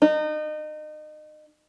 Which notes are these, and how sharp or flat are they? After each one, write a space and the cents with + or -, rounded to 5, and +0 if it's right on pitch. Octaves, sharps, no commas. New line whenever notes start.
D#4 -30